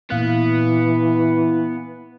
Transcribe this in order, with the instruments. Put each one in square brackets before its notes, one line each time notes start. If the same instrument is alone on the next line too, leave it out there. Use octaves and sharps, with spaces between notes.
[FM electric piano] A#2 F5 F#6 [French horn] E3 [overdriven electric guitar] B3